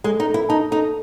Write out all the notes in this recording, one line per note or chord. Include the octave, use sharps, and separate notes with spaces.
G#3 A4
D#4
A4
E4
D#4 A5
D#4 A4